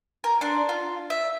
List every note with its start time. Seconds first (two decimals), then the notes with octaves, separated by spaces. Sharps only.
0.24 A#4
0.41 D4 C6
0.69 F4
1.10 E5